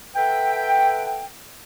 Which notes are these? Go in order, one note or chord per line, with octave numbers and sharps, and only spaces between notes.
A4 B4 E5 F#5 G5